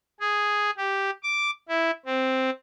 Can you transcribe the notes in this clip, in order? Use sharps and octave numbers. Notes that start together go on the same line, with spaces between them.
G#4
G4
D6
E4
C4